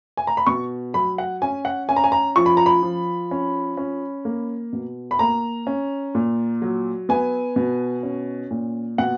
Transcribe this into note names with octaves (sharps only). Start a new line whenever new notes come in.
G#5
A#5
B5
B2 C#6
F#3 B5
F#5
C#4 G#5
F#5
C#4 G#5
A#5
G#5
A#5
F3 C#6
B5
A#5
B5
F3
C#4
C#4
A#3
B2
B5
A#3 A#5
C#4
A#2
F#3
B3 G#5
B2
C#4
A#2
B2 F#5